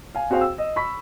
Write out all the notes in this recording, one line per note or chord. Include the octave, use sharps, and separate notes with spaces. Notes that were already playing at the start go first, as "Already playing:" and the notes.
F5 G#5
C4 F#4 G#4 C5 F5 G5
E6
D#5
B5 C#6 B6